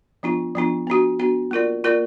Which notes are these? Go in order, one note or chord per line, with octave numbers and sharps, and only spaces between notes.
F3 B3 D4 F4
F3 B3 D4 F4
B3 D4 F#4
B3 D4 F#4
A#3 F4 A#4 D5
A#3 F4 A#4 D5